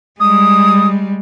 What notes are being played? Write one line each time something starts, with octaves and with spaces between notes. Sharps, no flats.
G3 G#3 D#6